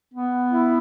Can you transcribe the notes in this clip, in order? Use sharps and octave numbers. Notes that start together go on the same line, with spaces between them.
B3
E4